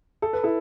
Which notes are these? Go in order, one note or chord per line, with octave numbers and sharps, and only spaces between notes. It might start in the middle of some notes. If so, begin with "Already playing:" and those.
A4
B4
E4 A4